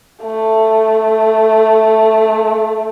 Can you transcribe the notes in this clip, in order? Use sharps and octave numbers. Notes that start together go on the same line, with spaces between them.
A3